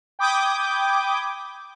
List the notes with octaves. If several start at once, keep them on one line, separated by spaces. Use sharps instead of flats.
G5 B5 D6 D#6 G6 G#6